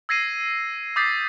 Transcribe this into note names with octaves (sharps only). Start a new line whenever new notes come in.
E6 G#6 A#6 C7 D#7
D6 D#6 G6 A6 B6 C7